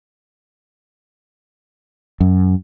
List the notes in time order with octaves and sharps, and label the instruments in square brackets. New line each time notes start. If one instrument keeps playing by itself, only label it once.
[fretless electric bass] F#2